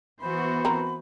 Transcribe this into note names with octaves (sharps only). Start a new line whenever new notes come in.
E3 B3 F#4 C5 B5
C4 A#4